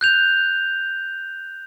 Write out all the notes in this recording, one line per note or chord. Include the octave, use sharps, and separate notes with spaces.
F#6 G6 F7